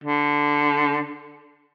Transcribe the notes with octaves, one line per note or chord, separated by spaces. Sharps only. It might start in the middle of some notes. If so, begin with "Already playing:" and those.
D3